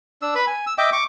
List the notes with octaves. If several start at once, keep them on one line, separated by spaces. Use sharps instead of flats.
D4 E6
B4 B5
G#5
E6
D#5 E5 G5 D6
C#6 D6